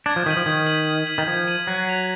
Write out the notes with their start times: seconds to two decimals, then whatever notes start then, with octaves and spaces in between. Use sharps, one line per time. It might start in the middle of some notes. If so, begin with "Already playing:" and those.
0.06 D4 G#6
0.16 F3
0.26 D#3 B6 D#7 F#7
0.37 F3
0.46 D#3 G#6
0.66 B6 D#7 F#7
0.87 G#6
1.07 D#7 F#7
1.18 D#3
1.27 F3 G#6
1.48 D#7 F#7
1.67 F#3 F#6
1.87 B6 F7